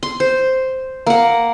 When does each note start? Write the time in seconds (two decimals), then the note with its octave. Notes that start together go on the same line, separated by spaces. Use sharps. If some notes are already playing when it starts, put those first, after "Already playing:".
0.03 C6
0.20 C5
1.06 A#3 F#5